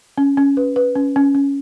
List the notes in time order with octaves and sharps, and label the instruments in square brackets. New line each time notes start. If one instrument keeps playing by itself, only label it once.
[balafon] C#4
C#4
B4
B4
C#4
C#4
C#4